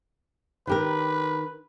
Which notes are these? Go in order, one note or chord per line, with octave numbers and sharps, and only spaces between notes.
D#3 G4 A#4 B4